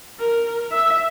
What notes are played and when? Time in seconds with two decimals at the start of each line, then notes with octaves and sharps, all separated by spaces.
0.20 A#4
0.72 E5 E6